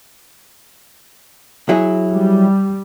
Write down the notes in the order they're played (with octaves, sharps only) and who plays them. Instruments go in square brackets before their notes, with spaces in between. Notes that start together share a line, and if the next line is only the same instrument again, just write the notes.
[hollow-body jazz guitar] F#3 E4 G#4
[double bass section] G3